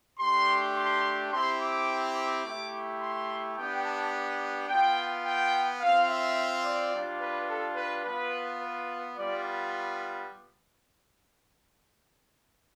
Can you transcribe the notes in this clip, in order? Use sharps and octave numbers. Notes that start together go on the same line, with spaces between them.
A3 D4 G4 C6
C6
C4 E4 G4 C6
D6
D6
A3 E4 G4
C6
B3 D4 G4 G5
A5
B3 F4 G5
G5
C4 F4 F5
E5
D5
G3 D4 F4
B4
A4
B4
B3 F4 B4
B4
G3 B3 F4 D5